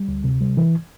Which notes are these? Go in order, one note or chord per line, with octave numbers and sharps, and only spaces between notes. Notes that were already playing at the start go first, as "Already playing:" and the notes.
Already playing: G3
D2
C3
G3
E3